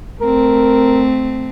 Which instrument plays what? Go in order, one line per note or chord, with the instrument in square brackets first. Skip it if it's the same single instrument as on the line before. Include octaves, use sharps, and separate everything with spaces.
[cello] A3 C4 [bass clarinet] A#4